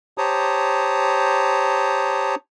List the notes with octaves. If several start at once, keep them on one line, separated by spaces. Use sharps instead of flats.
G4 C5 C#5 A5 A#5 D#6